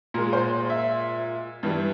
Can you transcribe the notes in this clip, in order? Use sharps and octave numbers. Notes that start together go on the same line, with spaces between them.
A#2 G#3 A#4
C5
E5
G2 E3 G3